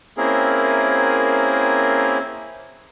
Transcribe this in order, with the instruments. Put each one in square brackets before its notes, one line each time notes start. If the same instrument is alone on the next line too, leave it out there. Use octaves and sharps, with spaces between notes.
[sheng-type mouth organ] A#3 C4 C#4 E4 G#4 A#4